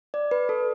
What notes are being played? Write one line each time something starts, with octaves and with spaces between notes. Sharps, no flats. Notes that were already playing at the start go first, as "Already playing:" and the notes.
D5
B4
A4